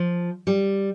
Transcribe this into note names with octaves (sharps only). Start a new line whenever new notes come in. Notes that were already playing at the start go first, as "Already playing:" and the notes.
Already playing: F3
G3